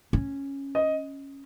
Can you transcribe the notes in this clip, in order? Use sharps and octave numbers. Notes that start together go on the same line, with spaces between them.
C#4
D#5